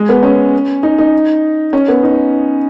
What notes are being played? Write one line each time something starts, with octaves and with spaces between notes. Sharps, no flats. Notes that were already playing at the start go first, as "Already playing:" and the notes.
Already playing: G#3
B3
C#4
D#4
D#4
C#4
B3
D#4